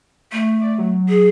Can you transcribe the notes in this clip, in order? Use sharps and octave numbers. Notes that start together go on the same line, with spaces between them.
A3
D5
F#3
G#4